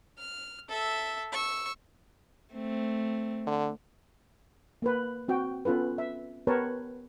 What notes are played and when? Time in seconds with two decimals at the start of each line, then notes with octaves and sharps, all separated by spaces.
0.18 F6
0.68 A4 E5
1.32 C#6 E6
2.53 A3 C4
3.47 D3
4.82 A#3 A#4 B4
5.28 C4 F#4 G5
5.65 B3 C#4 F4 A4 B4
5.98 E5
6.47 B3 G4 A#4 B4 C#5 A5